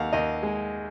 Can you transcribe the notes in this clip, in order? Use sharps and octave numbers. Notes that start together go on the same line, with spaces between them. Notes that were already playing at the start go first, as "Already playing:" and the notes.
Already playing: D#2 F5 F#5
D#2 D#5
G#3